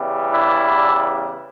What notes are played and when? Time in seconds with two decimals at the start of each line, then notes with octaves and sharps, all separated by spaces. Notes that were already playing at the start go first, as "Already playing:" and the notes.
Already playing: E2 C#3 E3 G3
0.32 D4 E4